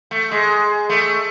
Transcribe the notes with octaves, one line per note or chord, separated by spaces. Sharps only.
A3
G#3
A3